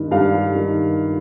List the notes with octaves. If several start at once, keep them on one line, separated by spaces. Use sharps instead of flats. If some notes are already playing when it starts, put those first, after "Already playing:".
Already playing: G2 D#3
G2 F5
D#3